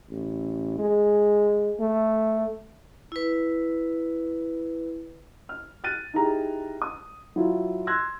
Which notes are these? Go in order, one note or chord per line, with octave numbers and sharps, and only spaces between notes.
A1
G#3
A3
E4 B4
F6
F6 F#6 A6 D#7
D#4 E4 G4 G#4 A#5
D#6
F#3 E4 F4
C6 E6 F#6 G#6 A#6